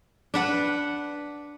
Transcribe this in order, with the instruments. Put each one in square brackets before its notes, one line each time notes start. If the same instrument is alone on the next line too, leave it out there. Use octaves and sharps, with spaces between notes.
[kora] D4 B4 F#5